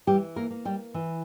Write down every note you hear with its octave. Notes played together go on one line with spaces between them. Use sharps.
E3 G3 G4
A#3 A#4
A#3
G3 G4
E3